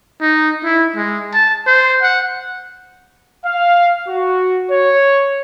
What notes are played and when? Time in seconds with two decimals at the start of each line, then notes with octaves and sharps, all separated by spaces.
0.21 D#4
0.64 E4
0.96 G#3
1.34 A5
1.67 C5
2.02 F#5
3.44 F5
4.08 F#4
4.70 C#5